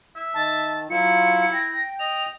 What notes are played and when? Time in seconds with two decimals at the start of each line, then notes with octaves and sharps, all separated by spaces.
0.16 E5
0.34 D#3 A5
0.90 F#3 E4 F4 C#7
1.53 G5 A#6
2.00 D#5 F7